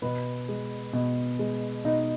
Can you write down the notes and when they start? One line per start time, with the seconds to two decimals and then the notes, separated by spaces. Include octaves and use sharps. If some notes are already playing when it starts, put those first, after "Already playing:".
0.02 B2 B3
0.48 G#3
0.93 B2
1.39 G#3
1.85 B2 D#4